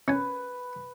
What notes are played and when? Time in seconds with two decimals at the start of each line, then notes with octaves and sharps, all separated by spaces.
0.08 C#4 B4 G#5